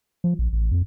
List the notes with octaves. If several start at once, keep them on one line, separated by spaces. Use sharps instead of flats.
F3
A#1
A1
F2